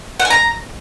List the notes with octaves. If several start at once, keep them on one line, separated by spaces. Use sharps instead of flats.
F#5
G#5
A#5